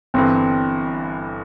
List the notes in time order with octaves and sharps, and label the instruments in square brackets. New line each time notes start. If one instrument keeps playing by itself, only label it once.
[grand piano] G1 G2 E3 [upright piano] C4